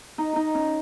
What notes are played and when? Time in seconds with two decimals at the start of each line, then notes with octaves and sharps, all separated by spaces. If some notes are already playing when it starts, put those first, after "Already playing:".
0.18 D#4
0.36 D#4
0.55 C#4